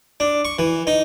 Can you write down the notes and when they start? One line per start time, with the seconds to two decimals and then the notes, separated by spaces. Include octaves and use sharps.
0.20 D4
0.45 C#6
0.59 E3
0.87 D#4